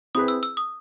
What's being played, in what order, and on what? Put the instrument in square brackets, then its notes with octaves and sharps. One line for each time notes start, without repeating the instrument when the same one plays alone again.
[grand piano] C4 E4 G#4 B4 [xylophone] D#6
[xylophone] E6
E6
D#6